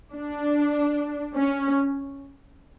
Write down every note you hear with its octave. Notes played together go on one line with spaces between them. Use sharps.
D4
C#4